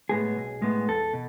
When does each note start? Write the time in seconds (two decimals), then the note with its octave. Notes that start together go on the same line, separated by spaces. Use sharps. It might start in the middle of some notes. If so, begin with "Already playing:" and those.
0.09 A2 G#3 B3 G#4
0.36 B1
0.62 A2 G#3 B3
0.88 E2 A4
1.13 B2